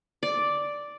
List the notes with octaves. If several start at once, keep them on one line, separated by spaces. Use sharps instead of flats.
D5